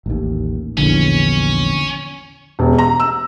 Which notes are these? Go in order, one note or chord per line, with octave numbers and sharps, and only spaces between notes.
A1 D#2
A#1 E2 D3 C#4
E1
A#5
E6